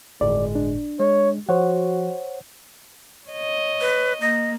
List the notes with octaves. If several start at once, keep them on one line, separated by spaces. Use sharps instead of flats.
G1 D#2 A2 G#3 D5
D4
G#3 C#5
F3 F#4 C5 C#5 F#5
C#5 D#5
B4
A#3 D#5